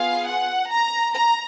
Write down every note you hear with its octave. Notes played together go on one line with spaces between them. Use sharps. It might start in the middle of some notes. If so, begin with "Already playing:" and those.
Already playing: B3 F4 G#4 F5
F#5
A#5
A#5